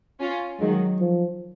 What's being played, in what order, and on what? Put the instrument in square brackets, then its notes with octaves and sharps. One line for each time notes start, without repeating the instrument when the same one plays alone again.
[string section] C#4 F4
[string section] D#3 F#3 [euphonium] G#3
[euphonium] F3